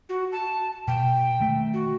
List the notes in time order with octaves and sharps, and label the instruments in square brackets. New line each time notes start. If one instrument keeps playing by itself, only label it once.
[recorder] F#4
A5
[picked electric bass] B2 [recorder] G5
[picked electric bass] D#3 A3
[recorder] F#4